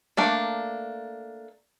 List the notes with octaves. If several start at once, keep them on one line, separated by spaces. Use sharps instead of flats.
A3 A#3 D4